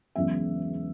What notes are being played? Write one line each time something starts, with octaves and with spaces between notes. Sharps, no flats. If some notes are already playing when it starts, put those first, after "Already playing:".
E1 E2 C#3 F#3 B3 E5